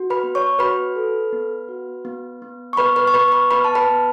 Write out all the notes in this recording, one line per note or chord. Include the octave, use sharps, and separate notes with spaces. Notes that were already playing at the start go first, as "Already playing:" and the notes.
Already playing: F#4
B4 B5
B3
C#5 C#6
F#4 B4 B5
A4
B3
F#4
B3
B3
C#6
B3 B4 B5
B4 B5
C#6
B3 B4 B5
C#6
B4 B5
B3 B4 B5
A5
B4 B5
B3